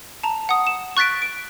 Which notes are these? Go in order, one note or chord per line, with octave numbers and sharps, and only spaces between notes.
A5 A#5
F#5 D#6
E7
C#6 F#6 A6 B6 D7
D7